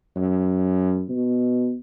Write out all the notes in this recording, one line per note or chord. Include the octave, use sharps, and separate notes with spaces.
F#2
B2